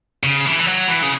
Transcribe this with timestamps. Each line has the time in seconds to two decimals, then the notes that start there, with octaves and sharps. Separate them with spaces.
0.23 C#3
0.45 E3
0.60 E3
0.66 F#3
0.88 E3
1.02 C#3